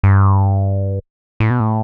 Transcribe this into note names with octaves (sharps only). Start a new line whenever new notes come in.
G2
A2
B2
A2